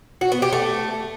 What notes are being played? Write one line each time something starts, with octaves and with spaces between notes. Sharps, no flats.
F#4
B3
G4
A3